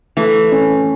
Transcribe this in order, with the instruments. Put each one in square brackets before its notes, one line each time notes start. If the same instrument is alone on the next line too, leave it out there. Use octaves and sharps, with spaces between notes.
[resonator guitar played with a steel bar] E3 [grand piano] A3
[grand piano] C#4